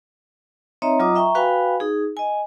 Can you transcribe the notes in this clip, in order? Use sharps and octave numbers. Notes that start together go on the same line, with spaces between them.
C4 D#4 C#5 D#5 E5 A#5
F#3 F4 D#5 A#5 D6 D#6
E5 G5 A#5 C#6
F#4 B4 F5 G5 G#5 B5
D#4 G#4
D#5 G#5